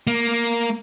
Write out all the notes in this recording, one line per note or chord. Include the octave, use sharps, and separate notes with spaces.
A#3